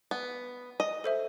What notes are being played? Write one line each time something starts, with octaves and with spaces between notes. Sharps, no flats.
B3
D#5
A4 C5 E5